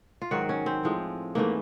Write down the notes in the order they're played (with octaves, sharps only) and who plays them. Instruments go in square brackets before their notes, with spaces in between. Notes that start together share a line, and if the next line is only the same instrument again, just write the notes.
[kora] F4
G#2 D#3 F#3 F#4
C#4
C4
A2 F3 G#3
G#2 E3 A3 A#3